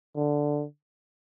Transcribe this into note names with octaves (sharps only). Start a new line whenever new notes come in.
D3